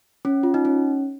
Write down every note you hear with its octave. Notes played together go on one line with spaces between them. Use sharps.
C#4
F4
D#4
C#4